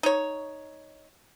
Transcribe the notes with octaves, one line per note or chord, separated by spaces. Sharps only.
D#4 C#5